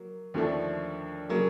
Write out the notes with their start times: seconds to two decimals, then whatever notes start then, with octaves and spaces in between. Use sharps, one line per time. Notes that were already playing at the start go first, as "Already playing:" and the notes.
Already playing: F#3 A#3
0.34 D#2 D3 F3 A3 D4
1.29 C#3 F#3 A#3